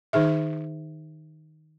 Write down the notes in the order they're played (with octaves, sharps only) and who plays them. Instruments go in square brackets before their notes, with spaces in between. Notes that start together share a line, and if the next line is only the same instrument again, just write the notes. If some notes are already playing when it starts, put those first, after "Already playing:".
[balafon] D#3 D#4 G#4 E5